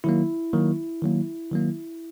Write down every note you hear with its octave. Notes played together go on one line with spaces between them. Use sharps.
D#3 F#3 A#3 E4
D#3 F#3 A#3
D#3 F#3 A#3
D#3 F#3 A#3